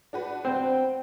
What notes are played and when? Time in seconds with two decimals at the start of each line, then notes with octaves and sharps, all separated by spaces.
0.13 D4 F#4 B4
0.45 C4 G5